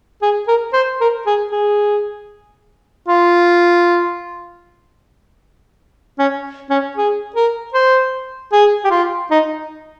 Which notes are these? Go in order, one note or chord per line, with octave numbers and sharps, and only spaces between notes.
G#4
A#4
C5
A#4
G#4
G#4
F4
C#4
C#4
G#4
A#4
C5
G#4
G4
F4
D#4